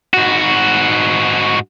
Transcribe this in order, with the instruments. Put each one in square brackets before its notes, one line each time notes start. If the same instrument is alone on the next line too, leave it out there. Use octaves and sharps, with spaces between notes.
[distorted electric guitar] G#2 F#4